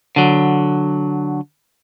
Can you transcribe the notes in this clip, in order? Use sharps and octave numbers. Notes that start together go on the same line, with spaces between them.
D3 F#3